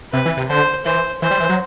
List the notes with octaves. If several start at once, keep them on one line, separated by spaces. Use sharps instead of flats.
C3 B4
E3
C3
D3 C5
E3 C5
E3 C5
G3
E3
F#3